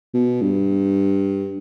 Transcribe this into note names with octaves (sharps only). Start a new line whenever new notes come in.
B2
G2